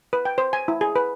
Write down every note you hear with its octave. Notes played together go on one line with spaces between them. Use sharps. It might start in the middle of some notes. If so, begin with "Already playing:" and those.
B4
G5
C5
G#5
E4
G#4
B4